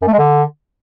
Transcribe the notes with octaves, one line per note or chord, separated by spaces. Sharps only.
F#2
A3
G#3
D3